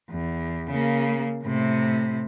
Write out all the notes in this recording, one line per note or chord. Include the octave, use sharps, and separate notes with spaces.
E2
C#3 A#3
A2 C3